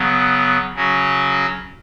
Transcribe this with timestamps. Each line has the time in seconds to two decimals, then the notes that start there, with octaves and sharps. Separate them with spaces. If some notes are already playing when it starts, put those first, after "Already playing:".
Already playing: C#3 F#3 B3
0.75 C#3 F#3 C#4 F#4